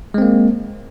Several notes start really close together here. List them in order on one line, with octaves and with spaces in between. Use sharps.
G#3 C4 A#3